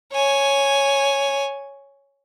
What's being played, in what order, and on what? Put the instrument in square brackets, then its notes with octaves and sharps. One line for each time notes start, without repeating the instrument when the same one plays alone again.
[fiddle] C#5 G#5